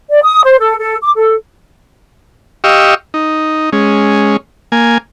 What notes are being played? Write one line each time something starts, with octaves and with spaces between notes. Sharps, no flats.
D5
D#6
C5
A4
A4
D6
A4
G4 D#5 F5 C#6 E6
D#4
G#3 C#4
A#3 G#5